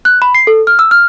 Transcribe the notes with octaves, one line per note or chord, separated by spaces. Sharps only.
F#6
B5
C7
A4
F6
E6
F6